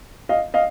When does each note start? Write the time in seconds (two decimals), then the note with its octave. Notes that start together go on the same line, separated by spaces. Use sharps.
0.29 D#5 F5
0.54 D#5 F5